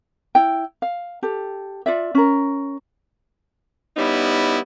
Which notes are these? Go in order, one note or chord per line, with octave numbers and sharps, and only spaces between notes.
E4 G5
F5
G4 A4
F4 D5 E5
C#4 A#4
G3 B3 C#4 D#4 E4